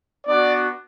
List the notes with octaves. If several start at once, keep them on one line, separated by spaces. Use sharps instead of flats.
B3 D4 F#4 D5